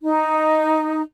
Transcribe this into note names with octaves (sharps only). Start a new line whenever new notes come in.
D#4